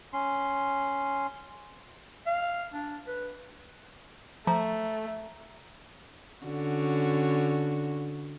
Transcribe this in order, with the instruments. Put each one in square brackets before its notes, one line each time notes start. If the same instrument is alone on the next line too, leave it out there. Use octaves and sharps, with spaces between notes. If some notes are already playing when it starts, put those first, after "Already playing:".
[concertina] C#4 C6
[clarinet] F5
D4
B4
[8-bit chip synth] F3 [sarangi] A3 [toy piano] A#5
[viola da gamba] D3 C#4 F#4